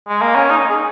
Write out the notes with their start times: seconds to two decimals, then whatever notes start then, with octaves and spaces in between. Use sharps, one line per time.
0.09 G#3
0.22 A#3
0.36 C#4
0.50 D#4
0.70 G#4